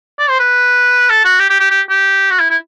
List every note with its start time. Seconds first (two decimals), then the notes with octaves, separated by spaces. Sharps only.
0.19 D5
0.30 C5
0.40 B4
1.10 A4
1.25 F#4
1.40 G4
1.50 G4
1.60 G4
1.71 G4
1.90 G4
2.31 F#4
2.40 E4
2.50 E4